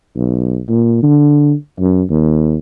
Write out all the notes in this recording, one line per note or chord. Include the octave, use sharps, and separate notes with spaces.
B1
A#2
D3
F#2
D#2